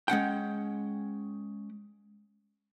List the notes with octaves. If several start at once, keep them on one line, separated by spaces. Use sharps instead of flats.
G#3 C#4 F#5 G5